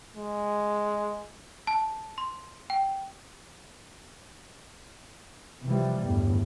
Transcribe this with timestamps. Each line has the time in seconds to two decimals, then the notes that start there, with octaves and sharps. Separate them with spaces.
0.15 G#3
1.67 A5
2.18 C6
2.70 G5
5.64 C3 E3 F3 G3
6.04 G1 E2 A2